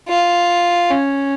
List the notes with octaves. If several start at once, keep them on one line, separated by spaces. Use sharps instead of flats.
F4
C#4